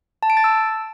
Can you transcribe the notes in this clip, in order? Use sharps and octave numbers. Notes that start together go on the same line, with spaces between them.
A5
D7
A6
E6